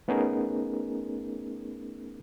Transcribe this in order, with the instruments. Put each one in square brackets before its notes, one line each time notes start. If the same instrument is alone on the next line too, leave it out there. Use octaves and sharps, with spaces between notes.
[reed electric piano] A3 B3 C#4 D#4 G#4 A#4